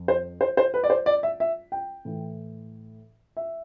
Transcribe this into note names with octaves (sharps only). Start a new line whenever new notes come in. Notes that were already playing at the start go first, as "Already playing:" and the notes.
Already playing: F2
C5
C5
C5
B4
D5
C5
D5
E5
E5
G5
A2 E3
E5